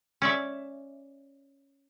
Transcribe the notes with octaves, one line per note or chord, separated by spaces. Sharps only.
C#4 D5 E5